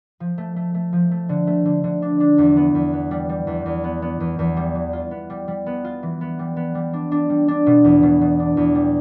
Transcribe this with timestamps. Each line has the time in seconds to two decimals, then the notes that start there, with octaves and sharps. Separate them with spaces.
0.20 F3
0.38 A3
0.56 A3
0.74 A3
0.93 F3
1.11 A3
1.29 D3
1.47 A3
1.65 D3
1.84 D3
2.02 D4
2.20 D4
2.38 E2
2.57 B3
2.75 E2
2.93 B3
3.11 G3
3.29 G3
3.47 E2
3.66 E2
3.84 B3
4.02 B3
4.20 E2
4.39 E2
4.57 G3
4.75 E3
4.93 F4
5.11 B3
5.30 G3
5.48 G3
5.66 B3
5.85 F4
6.03 E3
6.21 B3
6.39 G3
6.56 B3
6.75 G3
6.93 D4
7.12 D4
7.30 G3
7.48 D4
7.66 B2
7.84 E2
8.03 B2
8.21 B2
8.39 D4
8.57 E2
8.75 G3